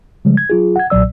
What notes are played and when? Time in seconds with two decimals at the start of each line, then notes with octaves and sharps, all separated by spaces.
0.25 C#3 F3 G3 G#3
0.37 G#6
0.50 F#3 F4 G#4
0.76 F#5 G#6
0.90 B1 A#2 F#3 D5 E6